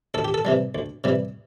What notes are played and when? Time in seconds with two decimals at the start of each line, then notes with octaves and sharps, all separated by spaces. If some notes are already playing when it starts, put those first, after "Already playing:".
0.14 D2 A4
0.24 G4
0.34 A4
0.45 C3 E3 G3
0.75 D2
1.04 C3 E3 G3